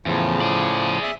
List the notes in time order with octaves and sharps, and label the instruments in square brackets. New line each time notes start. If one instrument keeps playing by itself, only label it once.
[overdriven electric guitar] E2 [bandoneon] A2 C#3 F3
[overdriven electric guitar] G#4 D5
[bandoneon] E5